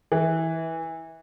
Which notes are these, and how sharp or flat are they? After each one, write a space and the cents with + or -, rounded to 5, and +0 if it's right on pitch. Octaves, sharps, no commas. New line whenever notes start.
E3 -20